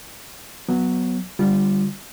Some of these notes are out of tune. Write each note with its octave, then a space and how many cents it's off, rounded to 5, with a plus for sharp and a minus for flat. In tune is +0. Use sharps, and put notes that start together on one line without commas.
F#3 +0 B3 -5
D3 +0 G3 +0 F4 -5